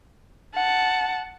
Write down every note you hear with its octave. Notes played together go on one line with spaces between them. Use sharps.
F#5 A5